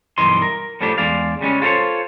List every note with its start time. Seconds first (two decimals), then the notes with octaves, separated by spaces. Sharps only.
0.18 B1 G2 E3 A#4 D#5 C6
0.42 A#4
0.81 A2 F3 G3 A3 D4 G4
0.98 E2 G#3 D4 D5 F5
1.41 C#3 G3 G#3 C#4
1.62 F4 F#4 A4 A#4 C5 C#5